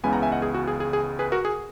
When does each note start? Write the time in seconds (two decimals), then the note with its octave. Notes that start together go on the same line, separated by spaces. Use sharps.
0.03 C#2 C#3 E3 G#3 B3 G#5 B5
0.13 F#5 A#5
0.22 E5 G#5
0.32 D#5 F#5
0.42 G#4
0.54 F#4
0.67 G#4
0.80 G#4
0.93 G#4
1.19 G#4 B4
1.32 F#4 A#4
1.45 G#4